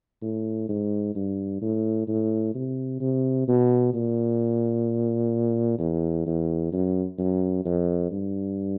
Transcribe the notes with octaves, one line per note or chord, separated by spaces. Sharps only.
A2
G#2
G2
A2
A2
C3
C3
B2
A#2
E2
E2
F#2
F#2
F2
G2